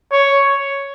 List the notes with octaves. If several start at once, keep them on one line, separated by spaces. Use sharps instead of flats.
C#5